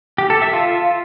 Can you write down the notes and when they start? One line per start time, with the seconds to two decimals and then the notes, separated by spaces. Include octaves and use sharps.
0.18 G4
0.30 A4
0.42 E5
0.53 F4